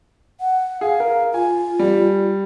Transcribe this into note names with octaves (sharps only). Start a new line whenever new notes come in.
F#5
G#4 F5
A#4
F4 G#5
G3